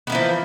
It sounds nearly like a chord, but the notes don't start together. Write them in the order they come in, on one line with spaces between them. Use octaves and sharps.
B3 A#3 E3 F3